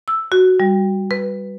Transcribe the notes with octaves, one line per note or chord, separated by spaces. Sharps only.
E6
F#4
G3
B4